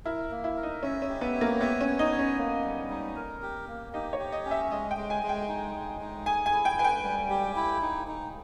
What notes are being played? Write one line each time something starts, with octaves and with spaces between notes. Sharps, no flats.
E4 A#4
A#3
E4
A#4
D#4
C#4 E5
C#4
G4
B3
C#5
A#3
B3 E5
C#4
C#5
D#4
C#5
C#4
A#3
G3
D#4
A#4
G4
A#3
D#4 G4
C#5
G4
D#5
C#4
E5
G#3 D#5
G5
G#3
G#5
G#3
G5
D#4
G#3
D#4
G#4 G#5
G#5
E4
G5
B4 G#5
G5
G3
G4
E4
D#4
D#4